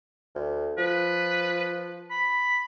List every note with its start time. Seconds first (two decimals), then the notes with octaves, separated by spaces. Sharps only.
0.35 D2
0.78 F3 B4
2.10 B5